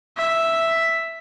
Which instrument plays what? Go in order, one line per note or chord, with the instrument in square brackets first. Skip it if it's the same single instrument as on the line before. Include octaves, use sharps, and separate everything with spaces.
[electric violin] E5